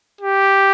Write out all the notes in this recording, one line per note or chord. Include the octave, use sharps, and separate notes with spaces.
G4